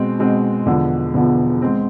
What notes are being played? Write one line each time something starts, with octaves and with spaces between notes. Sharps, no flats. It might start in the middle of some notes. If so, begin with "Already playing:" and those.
Already playing: B2 G#3 C4
B2 G#3 C4
E1 E2 D3 F3
E1 E2 D3 F3
G#3 C4